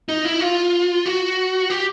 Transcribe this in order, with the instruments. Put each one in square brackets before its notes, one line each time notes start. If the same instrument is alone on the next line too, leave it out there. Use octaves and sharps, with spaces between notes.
[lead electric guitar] D#4
E4
F4
F#4
G4